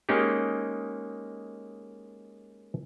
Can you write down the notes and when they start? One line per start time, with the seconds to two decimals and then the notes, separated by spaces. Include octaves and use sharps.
0.09 G#3 A#3 C#4 D#4 G4 G#4